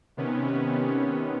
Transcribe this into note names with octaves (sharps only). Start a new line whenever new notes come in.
C3 D#3 B3 C#4